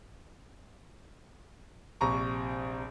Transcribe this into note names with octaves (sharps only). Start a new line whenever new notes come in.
A#1 C3 A#5 C#6